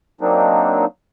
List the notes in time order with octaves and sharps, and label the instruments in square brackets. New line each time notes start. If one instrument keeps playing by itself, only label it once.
[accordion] F#3 A#3 C4 D4 D#4